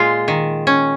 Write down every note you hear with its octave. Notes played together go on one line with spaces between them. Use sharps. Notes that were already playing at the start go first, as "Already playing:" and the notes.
Already playing: A#2 G#3 F4
D#3
C#4